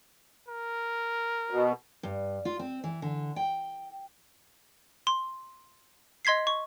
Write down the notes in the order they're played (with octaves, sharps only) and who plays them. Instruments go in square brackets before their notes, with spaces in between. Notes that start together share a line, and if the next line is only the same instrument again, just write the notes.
[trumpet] A#4
[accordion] B2
[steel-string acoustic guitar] G2
F4
C4
E3
D3
G5
[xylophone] C6
D#5 C6 G#6 B6 C7
C#6